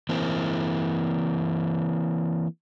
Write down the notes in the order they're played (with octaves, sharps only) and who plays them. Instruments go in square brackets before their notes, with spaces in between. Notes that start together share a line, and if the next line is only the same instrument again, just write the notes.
[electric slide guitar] E3 A#3 C4